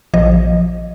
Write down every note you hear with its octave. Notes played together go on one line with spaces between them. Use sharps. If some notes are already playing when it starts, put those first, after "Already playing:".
A#1 F3 D#5